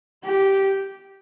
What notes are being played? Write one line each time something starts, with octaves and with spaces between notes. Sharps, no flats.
G4